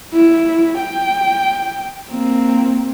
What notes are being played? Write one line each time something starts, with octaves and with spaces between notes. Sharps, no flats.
E4
G5
A#3 C4